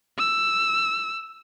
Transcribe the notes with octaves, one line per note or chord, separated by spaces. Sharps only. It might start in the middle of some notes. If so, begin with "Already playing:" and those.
E6